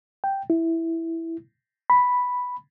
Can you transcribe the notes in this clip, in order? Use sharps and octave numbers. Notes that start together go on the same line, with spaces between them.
G5
E4
B5